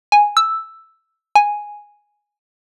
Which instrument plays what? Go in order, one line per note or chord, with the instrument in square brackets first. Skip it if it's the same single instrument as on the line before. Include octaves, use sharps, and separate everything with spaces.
[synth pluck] G#5
E6
G#5